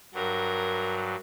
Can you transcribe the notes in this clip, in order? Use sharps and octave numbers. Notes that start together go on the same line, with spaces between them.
G2 F#3 A#4